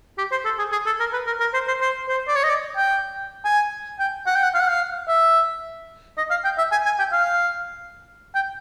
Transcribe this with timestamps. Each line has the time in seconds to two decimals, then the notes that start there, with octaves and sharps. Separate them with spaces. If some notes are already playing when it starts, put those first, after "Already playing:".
0.18 G4
0.31 C5
0.45 A4
0.59 G#4
0.72 G#4
0.86 A4
1.00 A#4
1.13 B4
1.27 A#4
1.40 A#4
1.54 C5
1.68 C5
1.81 C5
2.08 C5
2.28 D5
2.36 C#5
2.44 D#5
2.50 D5
2.76 G5
3.45 G#5
3.99 G5
4.26 F#5
4.35 G5
4.44 F#5
4.54 F5
4.60 F#5
4.69 F5
5.08 E5
6.18 D#5
6.30 F5
6.44 G5
6.58 E5
6.72 G#5
6.85 G#5
6.99 G5
7.12 F5
8.35 G5